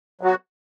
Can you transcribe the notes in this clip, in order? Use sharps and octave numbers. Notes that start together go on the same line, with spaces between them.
F#3 B3 F#4